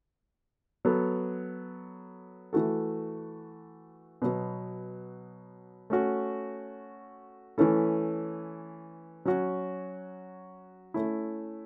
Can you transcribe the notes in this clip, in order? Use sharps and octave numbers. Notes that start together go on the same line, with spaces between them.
F#3 B3 A4
E3 A3 F#4 A4
B2 F#3 B3
A3 C#4 F#4
E3 A3 C#4 E4 A4
F#3 C#4 F#4
A3 C#4 E4